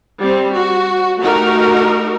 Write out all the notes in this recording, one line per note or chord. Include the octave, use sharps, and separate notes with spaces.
G3 C4
F#4
A3 D#4 F#4 G4 A#4